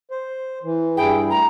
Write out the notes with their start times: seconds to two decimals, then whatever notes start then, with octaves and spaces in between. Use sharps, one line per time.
0.11 C5
0.63 E3
0.97 G2 E4 G#4 G5
1.30 A3 A#5